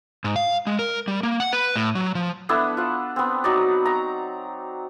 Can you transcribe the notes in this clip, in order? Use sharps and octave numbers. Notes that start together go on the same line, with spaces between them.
G#2
F5
G#3
A#4
G3
A#3
F#5
B4
A2
F#3
F3
B3 D4 E4 A4
F4 F#5
B3 C4
F#3 D#4 D5
A#5